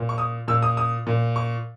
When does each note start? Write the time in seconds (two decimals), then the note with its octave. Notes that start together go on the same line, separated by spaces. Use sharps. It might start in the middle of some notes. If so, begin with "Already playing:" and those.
Already playing: A#2
0.09 C#6
0.18 D#6
0.48 A#2 E6
0.62 D#6
0.77 D#6
1.07 A#2
1.36 C#6